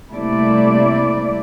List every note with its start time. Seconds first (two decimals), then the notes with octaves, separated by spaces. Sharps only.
0.11 C3 G3 A3 A#3 E4 D5